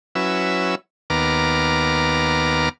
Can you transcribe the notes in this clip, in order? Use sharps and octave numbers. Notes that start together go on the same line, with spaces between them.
F#3 C#4 E4 B4 E6
D#2 B3 A#5 D6 F6